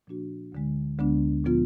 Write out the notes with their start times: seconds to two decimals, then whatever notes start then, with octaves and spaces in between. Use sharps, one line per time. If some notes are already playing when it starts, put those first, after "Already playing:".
0.07 A#2 F3 A#3 D4 F#4
0.52 D2 D3 G#3
0.98 D2 D3 G#3 B3 D4
1.45 A#2 F3 B3 F4